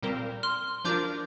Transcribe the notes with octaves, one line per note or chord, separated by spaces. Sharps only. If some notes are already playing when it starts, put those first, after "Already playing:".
A#2 G3 C4 A#4
C6 F6
F3 D4 F4 A#4 D6 G6